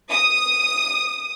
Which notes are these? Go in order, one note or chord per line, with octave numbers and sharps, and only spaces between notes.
D#6